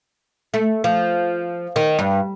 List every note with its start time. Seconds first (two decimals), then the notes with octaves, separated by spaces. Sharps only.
0.54 A3
0.84 F3
1.76 D#3
1.99 G2